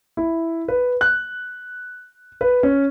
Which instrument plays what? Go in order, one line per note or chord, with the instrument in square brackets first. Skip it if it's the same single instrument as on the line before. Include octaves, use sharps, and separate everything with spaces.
[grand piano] E4
B4
F#6
B4
C#4